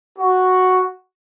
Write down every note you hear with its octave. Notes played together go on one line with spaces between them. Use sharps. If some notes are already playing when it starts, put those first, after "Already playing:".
F#4